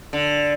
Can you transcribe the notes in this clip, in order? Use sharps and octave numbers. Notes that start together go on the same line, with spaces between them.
D3